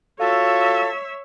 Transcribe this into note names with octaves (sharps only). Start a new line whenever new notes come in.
F4 F#4 A4 C#5 E5